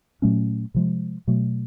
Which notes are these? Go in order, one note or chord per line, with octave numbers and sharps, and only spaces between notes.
A#2 F#3 A3 C#4
C3 F3 G#3
B2 F#3 A3